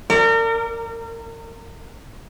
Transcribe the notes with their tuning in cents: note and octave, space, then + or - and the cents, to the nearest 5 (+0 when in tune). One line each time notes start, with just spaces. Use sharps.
A#4 -35 D5 +0